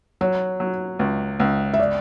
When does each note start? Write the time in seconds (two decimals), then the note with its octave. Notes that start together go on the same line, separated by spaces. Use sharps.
0.21 F#3 C#5
0.60 F#3
0.99 C#2
1.40 C#2
1.74 E5
1.80 D5